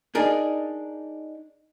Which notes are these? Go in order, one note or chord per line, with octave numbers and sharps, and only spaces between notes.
D4 D#4 G#4 A#4